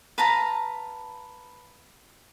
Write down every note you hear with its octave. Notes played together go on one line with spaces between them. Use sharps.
B4 F5 A5 A#5